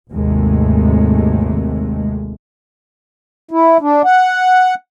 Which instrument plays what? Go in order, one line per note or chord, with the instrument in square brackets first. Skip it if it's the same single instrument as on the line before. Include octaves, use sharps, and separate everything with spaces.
[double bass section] G#1 D#2 C3 G#3 A3
[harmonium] E4
D4
F#5